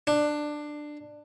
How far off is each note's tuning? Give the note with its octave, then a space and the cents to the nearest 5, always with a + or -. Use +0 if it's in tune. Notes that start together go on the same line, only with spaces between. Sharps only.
D4 +15